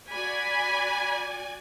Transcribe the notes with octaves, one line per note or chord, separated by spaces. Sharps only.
F#4 D5 G#5 B5